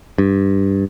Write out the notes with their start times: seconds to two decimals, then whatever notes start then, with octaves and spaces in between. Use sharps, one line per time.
0.18 G2